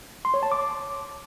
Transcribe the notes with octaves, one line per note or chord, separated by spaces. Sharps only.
C6
C#5
A5
D6